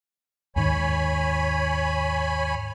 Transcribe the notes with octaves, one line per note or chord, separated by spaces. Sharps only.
D#2 G#2 D#3 C#5 G#5 B5